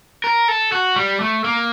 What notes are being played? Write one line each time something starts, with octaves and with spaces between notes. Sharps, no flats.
A#4
A4
F#4
G3
A3
A#3